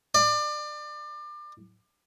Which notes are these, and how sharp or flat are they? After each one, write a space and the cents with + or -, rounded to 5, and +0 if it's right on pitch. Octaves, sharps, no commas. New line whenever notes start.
D5 +30